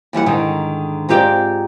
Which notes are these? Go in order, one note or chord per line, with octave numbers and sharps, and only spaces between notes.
D#2 E3 G3 F#5
G#2 D3 D#3
G#2 C4 F4 G4 D5 G5